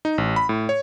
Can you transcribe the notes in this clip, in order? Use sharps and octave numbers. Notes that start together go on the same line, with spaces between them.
D#4
A1
B5
A2
C#5